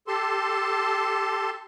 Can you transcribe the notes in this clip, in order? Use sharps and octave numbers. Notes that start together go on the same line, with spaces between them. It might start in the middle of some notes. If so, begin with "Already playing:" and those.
G4 A4 A5 C6